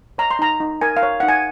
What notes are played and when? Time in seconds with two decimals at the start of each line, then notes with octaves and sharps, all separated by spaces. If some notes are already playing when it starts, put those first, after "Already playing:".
0.18 C#5 A#5
0.31 C6
0.39 D#4 A#5
0.60 D#4
0.81 A#4 G#5
0.97 F5
1.03 C#5
1.20 D#4 F#5
1.28 G#5